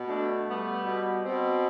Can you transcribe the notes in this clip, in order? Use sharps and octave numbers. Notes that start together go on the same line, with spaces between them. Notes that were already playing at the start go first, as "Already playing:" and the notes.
Already playing: B2
A3 D4
G3 B3
B2
B2 C4